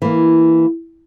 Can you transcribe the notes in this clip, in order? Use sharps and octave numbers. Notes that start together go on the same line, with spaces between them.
E3 A#3